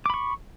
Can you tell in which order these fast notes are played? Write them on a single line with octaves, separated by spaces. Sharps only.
D6 B5 C#6